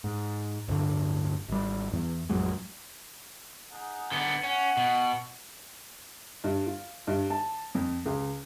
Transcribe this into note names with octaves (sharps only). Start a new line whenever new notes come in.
G#2
D1 G2 D3
G#1 G3
E2
A1 F2 F#3 G#3
D#4 G#4 F#5
D3 B3
C#4 F#5
B2
G2
F4
G2
A5
F2
C#2